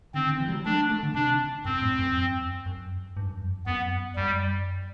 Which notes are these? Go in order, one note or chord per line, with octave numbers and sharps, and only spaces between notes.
D3 C4
D3
E3
G3
F#3
A3 D4
A3
D3
C3 D4
F#2 C4
A2
F#2
E2
F#2
F#2
G2
F#2
E2
F#2
F#2 B3
F#2 G3